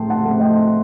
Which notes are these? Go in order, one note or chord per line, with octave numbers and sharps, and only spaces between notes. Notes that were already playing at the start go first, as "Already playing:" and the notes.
Already playing: A2 A3 G5 A5 C6
F#5 A5
A3
C4
D#5 G5